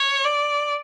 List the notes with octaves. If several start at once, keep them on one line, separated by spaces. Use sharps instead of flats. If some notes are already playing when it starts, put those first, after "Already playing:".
Already playing: C#5
D5